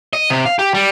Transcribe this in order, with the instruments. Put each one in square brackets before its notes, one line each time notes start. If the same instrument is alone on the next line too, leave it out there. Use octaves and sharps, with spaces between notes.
[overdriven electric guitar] D#5
C3
F5
G4
G3